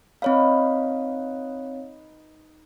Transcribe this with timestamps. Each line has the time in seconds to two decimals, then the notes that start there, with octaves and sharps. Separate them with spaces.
0.22 C4 D#4 B4 C#5 F5